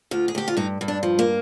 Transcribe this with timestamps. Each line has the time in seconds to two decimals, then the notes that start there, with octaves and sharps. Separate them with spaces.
0.11 D2 F4
0.28 G#4
0.35 D2 G4
0.48 F4
0.57 G2 D#4
0.81 G2
0.88 D4
1.03 F3
1.19 A#3